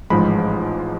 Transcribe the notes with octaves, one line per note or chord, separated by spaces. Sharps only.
A1 G#2 F3 G#3 B5